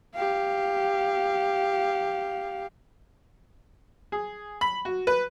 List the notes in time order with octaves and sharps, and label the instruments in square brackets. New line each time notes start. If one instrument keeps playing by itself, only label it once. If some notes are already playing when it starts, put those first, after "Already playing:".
[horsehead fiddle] G4 F5
[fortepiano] G#4
B5
F#4
B4